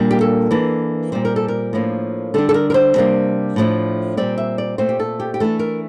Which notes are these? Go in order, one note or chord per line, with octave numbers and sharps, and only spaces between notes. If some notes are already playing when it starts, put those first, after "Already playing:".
Already playing: A#2 G3 A#3 D4
G4
A4
E3 A#3 D4
A#2 G3 C4 C5
A#4
A4
A#4
A2 F3 A#3 D4
D3 G3 D4 A4
A4
A#4
A#4
C5
C3 G3 A#3 D4
A2 F3 A3 D4
A#2 G3 C4 D5
E5
D5
A#2 A3 C4 C5
G4
A4
G4
G4
E3 A3 D4 A4
A#4